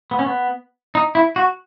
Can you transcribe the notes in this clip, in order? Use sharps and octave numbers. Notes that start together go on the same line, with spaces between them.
B3
C#4
B3
D#4
E4
F#4